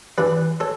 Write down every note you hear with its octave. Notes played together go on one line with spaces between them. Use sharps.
G2 E3 B4 D5
A4 C#5